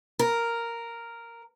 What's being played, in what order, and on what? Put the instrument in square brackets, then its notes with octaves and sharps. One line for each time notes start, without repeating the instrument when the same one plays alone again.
[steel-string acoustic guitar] A#4